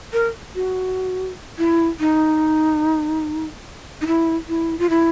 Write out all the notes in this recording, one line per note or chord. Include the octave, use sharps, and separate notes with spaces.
A#4
F#4
E4
D#4
D#4
E4
E4
F4
E4